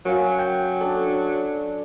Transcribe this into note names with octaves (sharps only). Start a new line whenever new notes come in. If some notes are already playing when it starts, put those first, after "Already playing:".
F#3 C#4 A#4 F5
G5
D4 A4